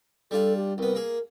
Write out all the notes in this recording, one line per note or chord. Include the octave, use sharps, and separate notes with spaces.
G3 D4 F4 A4
G4
C2 B3 A#4
A#3 G#4